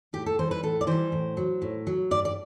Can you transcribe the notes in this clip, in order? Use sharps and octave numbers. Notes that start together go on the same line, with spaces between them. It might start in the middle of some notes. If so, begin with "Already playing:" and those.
A2 G4
A4
E3 G3 C5
B4
A2 A4
D5
E3 G3 C5
A2
F#3
A2
F#3
G2 D5
D5